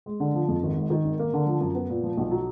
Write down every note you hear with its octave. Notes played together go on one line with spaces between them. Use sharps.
G#3
D3
F3
F2
G#1
G#2
D#3
G#1
A#3
D3
F3
F#2
B3
A#2
F3
B1
F#3